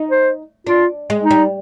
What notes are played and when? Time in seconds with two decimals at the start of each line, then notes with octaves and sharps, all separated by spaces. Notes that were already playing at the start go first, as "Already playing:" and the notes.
Already playing: D#4
0.11 C5
0.67 D4 F4
1.10 G#3
1.23 D#4
1.30 G3